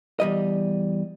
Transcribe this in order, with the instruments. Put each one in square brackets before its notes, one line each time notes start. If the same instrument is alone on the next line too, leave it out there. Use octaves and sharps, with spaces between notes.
[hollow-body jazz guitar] E2 G3 D#5